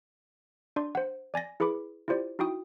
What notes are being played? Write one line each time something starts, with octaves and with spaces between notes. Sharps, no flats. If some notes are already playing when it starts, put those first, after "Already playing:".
D4 D5 C6
C5 F#5
D5 G#5 A6 A#6
E4 G#4 B4 B5 D6
E4 F4 G4 C5 D5
D#4 E4 F#4 G5 D#6